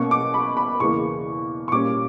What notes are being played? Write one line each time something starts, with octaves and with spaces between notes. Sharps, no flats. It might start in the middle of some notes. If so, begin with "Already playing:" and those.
Already playing: B2 A#3 C#4 C#6
D6
B5
B5
E2 C#3 E3 A#3 C#6
C#6
A#2 G3 A#3 C#4 D6